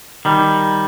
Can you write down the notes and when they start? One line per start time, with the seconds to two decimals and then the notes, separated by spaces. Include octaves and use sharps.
0.25 D#3 G3